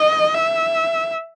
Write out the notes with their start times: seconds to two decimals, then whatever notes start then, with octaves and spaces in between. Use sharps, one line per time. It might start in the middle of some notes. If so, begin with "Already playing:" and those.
Already playing: D#5
0.34 E5